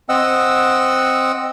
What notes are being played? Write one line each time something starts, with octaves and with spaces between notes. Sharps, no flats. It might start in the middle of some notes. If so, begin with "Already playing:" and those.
C4 D#5 F#5 E6